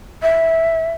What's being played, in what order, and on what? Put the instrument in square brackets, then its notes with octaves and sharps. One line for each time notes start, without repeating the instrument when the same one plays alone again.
[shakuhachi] E5